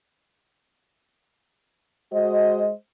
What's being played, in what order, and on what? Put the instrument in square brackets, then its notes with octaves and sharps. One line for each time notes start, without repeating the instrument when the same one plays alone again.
[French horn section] G#3 F#4 C5 D#5